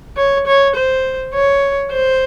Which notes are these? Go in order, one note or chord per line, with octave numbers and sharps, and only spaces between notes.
C#5
C#5
C5
C#5
C5